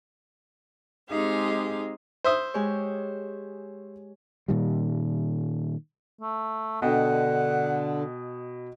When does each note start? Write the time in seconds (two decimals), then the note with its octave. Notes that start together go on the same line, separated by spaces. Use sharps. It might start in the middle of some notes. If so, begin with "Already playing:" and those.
1.08 G#3 C4 D#4 G4 G#4 F5
2.24 C5 E5 D#6
2.54 G#3 G4 C#5
4.48 A#2 D#3 G3
6.21 A3
6.82 B2 D3 D#5 F#5 G5